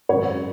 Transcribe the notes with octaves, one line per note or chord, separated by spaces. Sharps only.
G#1 F#2 C#3 C#5